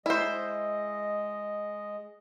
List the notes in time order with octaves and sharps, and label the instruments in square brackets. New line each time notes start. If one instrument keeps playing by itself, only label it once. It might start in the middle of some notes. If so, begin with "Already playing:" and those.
[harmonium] G#3 D#5 [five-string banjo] E4 C5